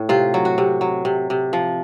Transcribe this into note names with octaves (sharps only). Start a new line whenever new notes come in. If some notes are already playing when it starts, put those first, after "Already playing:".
Already playing: A2
C3 F4
F#3
F#4
C3
F#3
C3
C3
F3